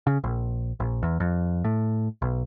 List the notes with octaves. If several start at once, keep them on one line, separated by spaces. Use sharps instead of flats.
C#3
A#1
A#1
E2
F2
A2
B1